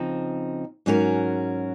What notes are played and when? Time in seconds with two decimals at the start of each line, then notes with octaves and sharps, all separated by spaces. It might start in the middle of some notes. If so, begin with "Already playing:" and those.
Already playing: C#3 F3 C4 D#4
0.86 G#2 F#3 C#4 F#4 A#4